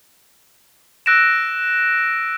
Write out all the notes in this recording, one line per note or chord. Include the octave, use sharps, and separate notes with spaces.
E6 F#6 A#6 D7 E7